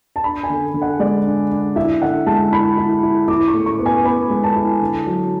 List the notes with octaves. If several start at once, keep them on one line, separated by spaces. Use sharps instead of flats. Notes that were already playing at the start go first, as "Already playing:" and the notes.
A5
D4 B5
G#5
D3
D3
F#5
G#3 D5
D4
D4
E4 E5
D3 F#5
G#3 A5
E4 B5
E4
E4
E4 D6
C#6
A2
C#6
B3
G#5
B3 B5
G#3
A5
E4
D3
F#3